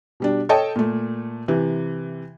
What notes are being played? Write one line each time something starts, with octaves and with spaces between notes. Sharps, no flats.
B2 G3 D4
A4 C#5 D#5 G5 A5
A#2 A3
C3 E3